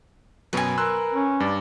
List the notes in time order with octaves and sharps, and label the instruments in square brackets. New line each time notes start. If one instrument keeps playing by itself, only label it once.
[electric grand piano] F#2 B2 F#3 [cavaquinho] B4 G#5
[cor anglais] A#4 [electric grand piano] C6 E6 F#6
[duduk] C#4
[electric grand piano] G2 [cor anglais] D5